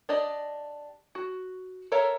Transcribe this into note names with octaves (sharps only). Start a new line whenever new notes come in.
D4 G4 D5 D#5
F#4
A4 A#4 C#5 E5 A#5